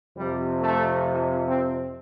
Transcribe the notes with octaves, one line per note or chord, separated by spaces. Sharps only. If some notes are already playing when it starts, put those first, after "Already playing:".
F2 C3 F3 G3
A3
C4